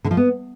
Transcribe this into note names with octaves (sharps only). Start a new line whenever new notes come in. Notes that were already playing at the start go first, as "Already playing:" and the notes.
D3
F3
B3